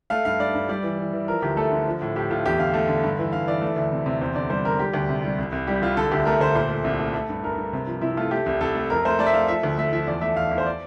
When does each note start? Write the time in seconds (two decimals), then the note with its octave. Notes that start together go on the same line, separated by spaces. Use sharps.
0.10 A3 F5
0.25 G2 F5
0.39 G2 D5
0.55 G2
0.69 G3 D5
0.83 E3
0.98 E3
1.13 E3
1.28 F3 A#4
1.42 D2 G4
1.57 A3 A4
1.72 D3
1.87 F3
2.02 A2
2.16 A2 G4
2.30 A2 F4
2.46 E2 G4
2.59 D3 F5
2.74 A3
2.88 D3
3.03 G2
3.19 E3
3.33 G2 F5
3.47 E3 D5
3.62 A3
3.76 D2
3.92 C3
4.06 C3
4.21 E2 C5
4.35 D3 D5
4.50 G3 C5
4.65 D3 A#4
4.79 G3 G4
4.94 D2 G4
5.09 C3
5.24 G3
5.38 C2
5.52 C2
5.67 G3 G4
5.82 C2 F4
5.97 D3 A4
6.11 D2 G4
6.26 A3 A#4
6.41 D2 C5
6.55 A#2 C5
6.69 A3
6.84 C2
6.99 A3
7.14 A3
7.29 G2
7.44 G2 A#4
7.58 G2
7.73 C3
7.87 F3
8.01 C3 E4
8.17 A3 F4
8.31 A3 G4
8.46 C2
8.61 C2 A4
8.75 A3
8.90 F2 A#4
9.05 A3 C5
9.19 A3 D5
9.26 E5
9.33 A3 F5
9.48 F3 E5
9.63 D2
9.78 A3 E5
9.92 F3 E5
10.07 E2 D5
10.21 A3 E5
10.36 E2 F5
10.51 E2
10.58 C5
10.66 D5